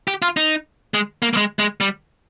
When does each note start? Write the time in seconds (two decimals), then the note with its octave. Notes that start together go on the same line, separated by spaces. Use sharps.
0.08 G4
0.22 F4
0.37 D#4
0.94 G#3
1.22 A#3
1.33 A#3
1.37 G#3
1.59 G#3
1.80 G3